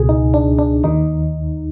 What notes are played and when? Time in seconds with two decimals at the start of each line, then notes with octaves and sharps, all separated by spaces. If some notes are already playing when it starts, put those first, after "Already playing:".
Already playing: C#2 B2 G#4
0.09 D#4
0.34 D4
0.59 D4
0.84 D#2 D#3 D#4